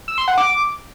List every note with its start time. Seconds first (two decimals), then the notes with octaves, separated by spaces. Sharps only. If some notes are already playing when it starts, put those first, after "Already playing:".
0.08 E6
0.18 C6
0.28 F#5
0.38 D6